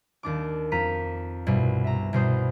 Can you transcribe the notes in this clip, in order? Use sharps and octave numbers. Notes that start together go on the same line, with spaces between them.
D#2 D4 D6
F2 A#5 B6 D#7
C2 G2 B2
E5 A#5
C2 B2 C5 D#6